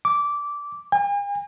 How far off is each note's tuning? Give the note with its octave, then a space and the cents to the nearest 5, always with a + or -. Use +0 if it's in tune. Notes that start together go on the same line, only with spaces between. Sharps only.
D6 -15
G#5 -45